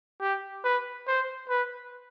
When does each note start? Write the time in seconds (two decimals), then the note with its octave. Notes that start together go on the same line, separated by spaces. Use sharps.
0.21 G4
0.64 B4
1.08 C5
1.49 B4